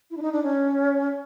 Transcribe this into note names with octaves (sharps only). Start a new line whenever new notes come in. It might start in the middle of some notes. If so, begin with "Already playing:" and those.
E4
D4
D#4
D4
C#4